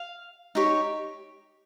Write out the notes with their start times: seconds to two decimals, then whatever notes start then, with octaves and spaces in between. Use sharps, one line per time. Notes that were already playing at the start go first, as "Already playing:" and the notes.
Already playing: F5
0.55 D#4 G4 C#5